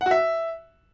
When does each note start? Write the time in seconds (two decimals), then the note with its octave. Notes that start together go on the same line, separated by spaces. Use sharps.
0.01 F#5
0.06 F#4
0.11 E5